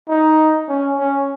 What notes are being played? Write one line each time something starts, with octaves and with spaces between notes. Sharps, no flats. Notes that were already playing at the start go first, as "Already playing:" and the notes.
D#4
C#4
C#4